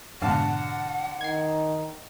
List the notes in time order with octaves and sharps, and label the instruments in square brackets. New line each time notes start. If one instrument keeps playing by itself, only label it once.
[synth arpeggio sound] F2 G#2 B2 [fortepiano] D3 F5 A5 [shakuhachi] F#5
[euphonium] D#3 [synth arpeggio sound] G#6 C7